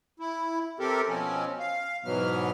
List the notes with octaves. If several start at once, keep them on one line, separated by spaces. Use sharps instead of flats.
E4
C3 C4 G4 A4 A#4
B2 F3 C4 C#4
F5
G#2 B2 E3 F#3 B3 F6